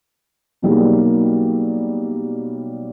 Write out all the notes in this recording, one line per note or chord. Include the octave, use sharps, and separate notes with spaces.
B2 F#3 G3 A#3 D#4 G#4